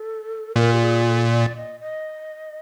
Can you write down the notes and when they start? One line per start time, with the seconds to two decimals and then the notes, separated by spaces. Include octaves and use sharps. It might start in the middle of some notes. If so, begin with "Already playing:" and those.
Already playing: A4
0.56 A#2 A#4
0.73 G4
0.81 G#4
1.06 A4
1.30 D5
1.56 D#5
1.80 D#5